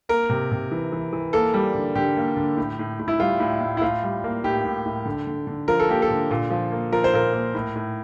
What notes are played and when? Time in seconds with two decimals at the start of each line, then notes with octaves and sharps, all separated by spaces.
0.09 A#3 A#4
0.30 C3
0.51 C3
0.71 E3
0.92 E3
1.13 E3
1.33 A#3 A4
1.54 G3
1.75 D3
1.95 D3 G4
2.17 A#3
2.36 D3
2.57 A2
2.79 A2
2.99 A2
3.08 E4
3.20 G3 F4
3.40 A2
3.61 A2
3.77 E4
3.81 A2 F4
4.03 G3
4.24 A#3
4.44 A2 G4
4.65 A2
4.86 A2
5.06 D3
5.27 D3
5.47 D3
5.68 F3 A#4
5.79 A4
5.89 A#3 G4
6.02 A4
6.10 D3
6.31 A#2
6.50 F3
6.72 A#3
6.92 F3 A#4
7.04 C5
7.13 A#2 A#4
7.33 A#3
7.54 A2
7.75 A2